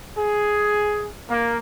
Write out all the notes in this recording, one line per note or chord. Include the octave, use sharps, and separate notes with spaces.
G#4
A#3